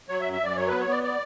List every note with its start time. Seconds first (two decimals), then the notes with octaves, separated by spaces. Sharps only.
0.09 F#3 C#5
0.21 E5
0.25 F#2
0.33 E5
0.41 F#2 D5
0.56 F#3 C#5
0.68 B3 B4
0.80 C#5
0.87 B3 D5
1.03 D5